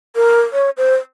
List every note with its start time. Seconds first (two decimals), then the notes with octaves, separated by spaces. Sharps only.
0.16 A#4
0.53 C#5
0.77 C5